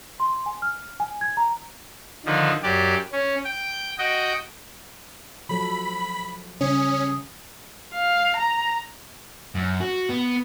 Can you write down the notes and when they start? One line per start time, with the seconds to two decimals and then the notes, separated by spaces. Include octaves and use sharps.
0.20 C6
0.46 G#5
0.62 F6
1.00 G#5
1.21 G#6
1.37 A#5
2.26 D3 D#3 F3
2.63 F#2 G4 D5
3.12 C#4
3.44 G5
3.98 F#4 D#5 G5
5.49 F3 F#3 A4 B5
6.61 C#3 G3 C#4 G#4
7.94 F5
8.37 A#5
9.55 F#2
9.81 F#4
10.10 B3